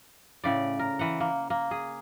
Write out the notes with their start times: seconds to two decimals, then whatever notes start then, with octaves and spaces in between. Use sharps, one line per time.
0.44 A2 C#3 D5
0.79 A#4
0.99 E3 F#5
1.20 A#3
1.50 A#3
1.71 G#4